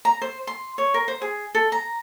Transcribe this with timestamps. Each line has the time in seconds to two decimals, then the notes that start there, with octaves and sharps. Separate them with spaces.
0.05 A#5
0.22 C5
0.47 C6
0.78 C#5
0.94 A#4
1.08 C5
1.22 G#4
1.55 A4
1.72 A#5